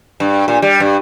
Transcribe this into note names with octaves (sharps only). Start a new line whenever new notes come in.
G2
A#2
G3
G2